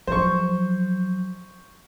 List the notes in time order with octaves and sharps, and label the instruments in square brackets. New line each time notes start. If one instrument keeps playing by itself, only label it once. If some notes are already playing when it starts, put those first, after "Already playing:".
[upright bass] F3 F#3 [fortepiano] C5 C#6